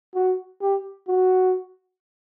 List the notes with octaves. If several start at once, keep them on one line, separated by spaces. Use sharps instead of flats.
F#4
G4
F#4